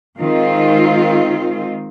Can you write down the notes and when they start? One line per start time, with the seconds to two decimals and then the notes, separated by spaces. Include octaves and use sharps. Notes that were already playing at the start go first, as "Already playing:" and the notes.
0.19 D#3 G#3 C4 F4